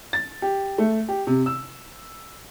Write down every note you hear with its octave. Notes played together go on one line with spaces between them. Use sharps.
A6
G4
A3
G4
C3
E6